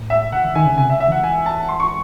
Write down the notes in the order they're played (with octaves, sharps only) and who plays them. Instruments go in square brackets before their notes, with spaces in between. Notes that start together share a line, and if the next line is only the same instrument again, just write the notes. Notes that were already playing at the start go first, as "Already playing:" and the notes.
Already playing: [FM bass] A2
[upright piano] E5
[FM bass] C#3 [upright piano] F#5
[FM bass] E3
[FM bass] D#3 [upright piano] G#5
[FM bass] C#3
[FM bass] C3 [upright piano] G#5
[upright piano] E5
[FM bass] C#3
[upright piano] E5
[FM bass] E3 [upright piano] F#5
[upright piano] G#5
A5
C6
C#6